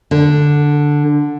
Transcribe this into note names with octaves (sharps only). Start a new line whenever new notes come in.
D3